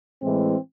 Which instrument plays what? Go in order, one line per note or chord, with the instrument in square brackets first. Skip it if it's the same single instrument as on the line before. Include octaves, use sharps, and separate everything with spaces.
[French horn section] A2 E3 G#3 C4